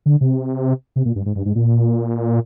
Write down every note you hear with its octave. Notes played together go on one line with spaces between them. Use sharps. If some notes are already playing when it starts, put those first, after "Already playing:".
D3
C3
C3
A#2
G2
G#2
G2
G#2
A#2